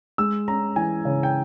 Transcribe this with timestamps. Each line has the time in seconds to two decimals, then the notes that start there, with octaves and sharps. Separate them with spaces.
0.18 G#3 E6
0.48 C#4 A#5
0.76 E3 G#5
1.05 C#3
1.23 G5